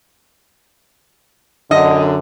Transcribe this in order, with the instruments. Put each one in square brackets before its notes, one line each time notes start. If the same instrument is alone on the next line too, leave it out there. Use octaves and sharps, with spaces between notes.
[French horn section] F#2 D3 [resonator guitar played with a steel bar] D#5